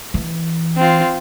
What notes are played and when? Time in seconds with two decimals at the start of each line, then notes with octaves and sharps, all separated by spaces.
0.14 E3
0.77 C4 F4